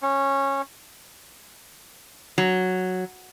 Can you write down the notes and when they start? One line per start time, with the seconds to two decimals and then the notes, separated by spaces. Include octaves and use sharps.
0.02 C#4
2.38 F#3